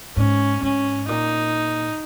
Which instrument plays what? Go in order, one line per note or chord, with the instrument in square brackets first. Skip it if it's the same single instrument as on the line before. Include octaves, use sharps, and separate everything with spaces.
[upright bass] G#2 [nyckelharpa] C#4
[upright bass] G#2 [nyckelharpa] C#4
[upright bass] A#2 [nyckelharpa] D#4